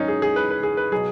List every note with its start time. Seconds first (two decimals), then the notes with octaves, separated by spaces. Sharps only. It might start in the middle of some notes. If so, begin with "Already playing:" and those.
Already playing: G#2 D#3 F#3 C#4 D#4
0.08 G#4
0.22 G#4
0.36 B4
0.50 B4
0.63 G#4
0.77 B4
0.92 B2 F#3 G#4